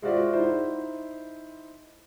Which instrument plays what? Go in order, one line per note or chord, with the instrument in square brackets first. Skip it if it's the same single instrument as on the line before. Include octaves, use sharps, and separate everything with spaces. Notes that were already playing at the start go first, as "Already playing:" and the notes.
[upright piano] G#3 F4 F#4 C5 D5 E5
D#4 E4 C5